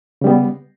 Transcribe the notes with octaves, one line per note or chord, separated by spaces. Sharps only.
C#3 G3 B3